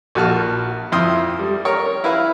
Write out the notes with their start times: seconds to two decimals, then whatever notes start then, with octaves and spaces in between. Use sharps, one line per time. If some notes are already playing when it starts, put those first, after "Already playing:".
0.15 A#1 F#4 A5 F6
0.92 F2 E4 G5 C6 D#6 F6
1.39 G3
1.65 A#4 C#5
2.04 E4 B4 F5